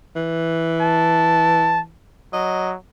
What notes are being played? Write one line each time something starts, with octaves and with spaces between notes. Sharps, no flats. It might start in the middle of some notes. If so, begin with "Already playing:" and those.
E3
A5
F#3 D#5